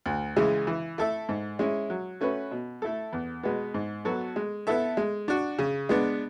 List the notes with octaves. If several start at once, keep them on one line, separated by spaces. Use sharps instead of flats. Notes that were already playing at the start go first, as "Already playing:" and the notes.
D2
C#3 E3 G#3
E3
A3 E4 A4 E5
G#2
G#3 C#4 E4
F#3
A3 C#4 F#4 B4
B2
A3 E4 A4
E2
B2 G#3 B3
G#2
F#3 B3 F#4 A4
G#3
B3 E4 A4 E5
G#3
D4 F#4
C#3
G#3 B3 D4